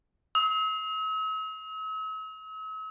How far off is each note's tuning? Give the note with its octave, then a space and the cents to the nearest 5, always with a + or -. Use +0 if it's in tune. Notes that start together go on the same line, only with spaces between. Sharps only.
E6 -45